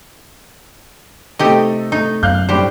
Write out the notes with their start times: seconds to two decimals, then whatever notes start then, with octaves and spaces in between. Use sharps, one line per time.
1.39 C3 A3 D#4 G4 A4 D#5
1.92 A3 D#4
2.23 F#2 F5 F#6 G6
2.49 A2 G3 D4 G4 C5